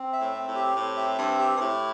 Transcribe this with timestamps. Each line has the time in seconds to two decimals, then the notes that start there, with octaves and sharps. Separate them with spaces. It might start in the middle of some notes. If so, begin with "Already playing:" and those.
Already playing: C4
0.13 E5
0.20 A2
0.35 C4
0.48 A2
0.55 G4
0.76 A2 C4
0.97 E5
1.18 G2 C4
1.39 G4
1.57 G2
1.61 A2 E4